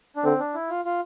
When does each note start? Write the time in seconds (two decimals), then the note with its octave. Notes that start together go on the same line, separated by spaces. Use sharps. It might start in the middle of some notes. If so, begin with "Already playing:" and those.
0.16 D4
0.24 D3 C4
0.39 D4
0.54 E4
0.70 F4
0.85 F4